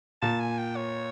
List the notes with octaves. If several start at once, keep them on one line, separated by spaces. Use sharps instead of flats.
A#2 A5
G#5
G5
C#5